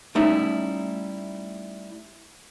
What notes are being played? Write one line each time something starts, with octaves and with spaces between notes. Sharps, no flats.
G3 A3 C#4 D#4 E4